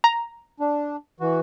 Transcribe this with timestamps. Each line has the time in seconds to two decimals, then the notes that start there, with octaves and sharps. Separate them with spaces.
0.04 A#5
0.60 D4
1.20 E3 F#4